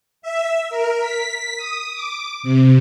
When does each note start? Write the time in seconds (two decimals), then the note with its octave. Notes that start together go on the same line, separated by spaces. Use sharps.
0.22 E5
0.70 A#4
1.00 B6
1.57 D#6
1.94 D6
2.43 C3